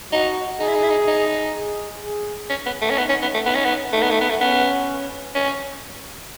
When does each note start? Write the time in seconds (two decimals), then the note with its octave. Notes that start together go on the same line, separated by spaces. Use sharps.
0.12 D#4 F#4
0.60 D#4 G#4
0.68 E4
0.75 D#4
0.83 E4
0.90 D#4
1.07 D#4
1.55 G#4
2.02 G#4
2.50 C#4
2.66 B3
2.82 A3
2.90 C#4
2.98 B3 D#4
3.09 C#4
3.22 B3
3.34 A3
3.45 B3 D#4
3.55 C#4
3.65 B3
3.93 A3 D#4
4.02 B3
4.11 A3
4.21 B3
4.30 A3
4.41 B3 C#4
5.35 C#4